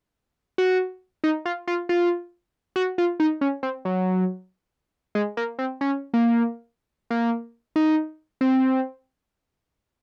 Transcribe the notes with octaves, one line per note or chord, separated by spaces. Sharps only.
F#4
D#4
F4
F4
F4
F#4
F4
D#4
C#4
C4
F#3
G#3
A#3
C4
C#4
A#3
A#3
D#4
C4